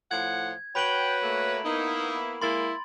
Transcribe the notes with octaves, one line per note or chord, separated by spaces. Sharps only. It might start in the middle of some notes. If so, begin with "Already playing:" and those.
A2 F3 F#5 G#6
F#4 B4 C#5 G5 B5 D7 F#7
A3 A#3
A#3 B3 D#4 E4
G#3 A#3 E4 C6 A6